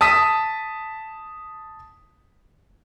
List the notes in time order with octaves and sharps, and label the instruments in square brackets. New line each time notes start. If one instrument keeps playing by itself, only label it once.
[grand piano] A5 D#6 B6